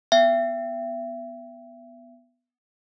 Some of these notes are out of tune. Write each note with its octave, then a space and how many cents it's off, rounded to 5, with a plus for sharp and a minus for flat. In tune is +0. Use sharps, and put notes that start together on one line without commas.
B3 +0 E5 +35 G5 -15